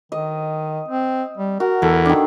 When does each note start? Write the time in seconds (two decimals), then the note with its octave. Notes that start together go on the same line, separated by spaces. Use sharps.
0.12 D#3 D#5
0.88 C4
1.38 G3
1.60 F#4 A#4
1.82 E2 A4
2.05 D#3 D4